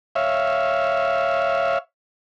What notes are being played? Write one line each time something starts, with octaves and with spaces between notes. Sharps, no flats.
C#5 E5 F5